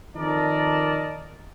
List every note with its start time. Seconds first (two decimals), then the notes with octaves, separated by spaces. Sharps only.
0.16 F2 D#3 A#4 D5 D#5 A5